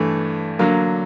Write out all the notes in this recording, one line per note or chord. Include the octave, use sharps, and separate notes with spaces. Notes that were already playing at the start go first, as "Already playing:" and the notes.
Already playing: G2 E3 A3
D3 F#3 A#3